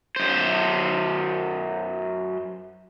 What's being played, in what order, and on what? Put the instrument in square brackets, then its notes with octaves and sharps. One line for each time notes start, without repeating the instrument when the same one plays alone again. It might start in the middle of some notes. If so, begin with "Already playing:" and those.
[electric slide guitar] F#2 C5